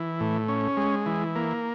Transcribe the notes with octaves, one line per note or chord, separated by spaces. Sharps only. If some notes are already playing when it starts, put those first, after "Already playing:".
Already playing: E3
A2
C#4
G#3
E3
A#3